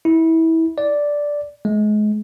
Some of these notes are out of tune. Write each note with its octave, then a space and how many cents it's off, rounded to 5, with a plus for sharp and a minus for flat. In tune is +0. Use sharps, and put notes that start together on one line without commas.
E4 -25
D5 -5
G#3 +30